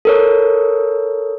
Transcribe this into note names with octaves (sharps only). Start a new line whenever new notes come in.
A4 A#4 C#5